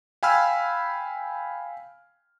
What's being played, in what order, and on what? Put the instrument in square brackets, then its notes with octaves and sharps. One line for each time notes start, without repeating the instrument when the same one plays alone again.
[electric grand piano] F5 G5 G#5 B5 E6 F6